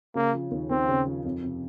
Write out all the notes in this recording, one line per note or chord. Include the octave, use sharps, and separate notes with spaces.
C#3 A#3
F3
D#2
D#2 C4
C#3
F3
F2
C3